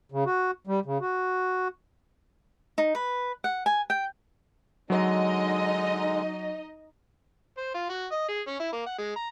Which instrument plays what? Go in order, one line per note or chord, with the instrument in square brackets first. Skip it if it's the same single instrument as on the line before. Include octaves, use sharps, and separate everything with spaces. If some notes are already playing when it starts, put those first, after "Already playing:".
[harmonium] C#3
F#4
G3
C#3
F#4
[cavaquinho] D#4
B4
F#5
G#5
G5
[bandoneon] D3 G#3 [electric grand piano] F#3 [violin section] D#4 D#5
[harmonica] C5
F4
F#4
D#5
G#4
C#4
E4
A#3
F#5
G#3
A#5